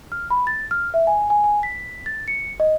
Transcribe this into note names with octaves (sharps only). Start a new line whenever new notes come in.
F6
B5
A6
F6
E5
G#5
G#5
G#5
B6
A6
C#7
D#5